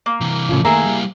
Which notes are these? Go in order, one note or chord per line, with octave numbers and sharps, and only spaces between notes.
A#3
C3 E3
A2 C#3 F3
D#3 A3 A#3 G#4 E5 A#5
G3 E4